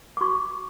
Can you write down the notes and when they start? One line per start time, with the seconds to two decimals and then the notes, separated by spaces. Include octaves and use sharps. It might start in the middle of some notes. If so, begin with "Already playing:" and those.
0.17 D6
0.21 F#4 C#6